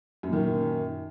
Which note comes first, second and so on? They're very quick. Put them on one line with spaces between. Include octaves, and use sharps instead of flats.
F#2 A#2 D#3